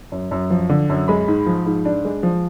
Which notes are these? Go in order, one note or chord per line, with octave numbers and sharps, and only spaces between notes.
F#2
F#2
F3
D3
F#2
G#3 B5
G#2
F3
G#2
D4
G#3
F3